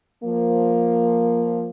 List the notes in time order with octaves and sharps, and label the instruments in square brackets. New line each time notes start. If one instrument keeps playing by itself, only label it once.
[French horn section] F3 A#3